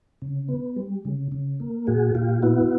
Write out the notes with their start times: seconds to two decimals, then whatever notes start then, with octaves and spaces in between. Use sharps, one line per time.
0.22 C#3
0.49 B3
0.76 G3
1.05 C#3
1.32 C#3
1.60 A#3
1.87 A#2 F#4 G#4
2.15 A#2 F4 G4
2.42 B3 E4 F#4